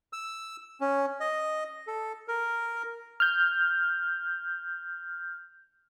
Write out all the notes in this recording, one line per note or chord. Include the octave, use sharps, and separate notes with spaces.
E6
C#4
D#5
A4
A#4
F6 G6